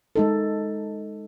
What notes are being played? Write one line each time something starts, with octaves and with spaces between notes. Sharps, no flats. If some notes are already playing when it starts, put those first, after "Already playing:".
G#3 D#4 A4